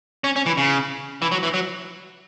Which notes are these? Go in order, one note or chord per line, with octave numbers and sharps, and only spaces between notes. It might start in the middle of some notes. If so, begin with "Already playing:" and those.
C#4
C#4
E3
C#3
E3
F#3
E3
F#3